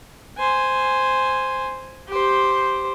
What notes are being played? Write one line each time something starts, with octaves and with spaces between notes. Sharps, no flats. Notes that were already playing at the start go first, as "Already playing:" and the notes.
C5 G#5
G4 C5